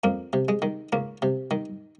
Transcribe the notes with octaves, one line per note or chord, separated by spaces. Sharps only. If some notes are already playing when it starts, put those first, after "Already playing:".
F2 A#3
C3
G#3
D#3
C#2 A#3
C3
D#3